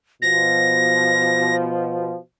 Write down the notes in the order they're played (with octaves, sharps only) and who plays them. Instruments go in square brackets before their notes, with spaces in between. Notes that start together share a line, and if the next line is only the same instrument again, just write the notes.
[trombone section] B2 F3 [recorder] A#6